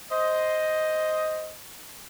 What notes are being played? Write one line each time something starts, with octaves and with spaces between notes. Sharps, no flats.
C5 D#5